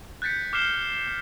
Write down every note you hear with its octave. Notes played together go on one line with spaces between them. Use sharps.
F#6 G6 A6 B6 C#7
D6 F6 F#6 C7 E7 G7